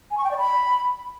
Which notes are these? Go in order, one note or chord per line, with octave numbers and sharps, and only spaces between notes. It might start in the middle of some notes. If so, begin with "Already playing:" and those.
G#5
C#6
G5
D5
B5